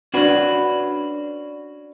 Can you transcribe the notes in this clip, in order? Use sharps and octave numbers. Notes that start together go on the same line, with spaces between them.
C#4 D4 F#4 B4